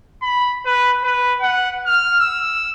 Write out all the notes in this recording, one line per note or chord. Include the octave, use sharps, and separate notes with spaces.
B5
B4
B4
F#5
F6
E6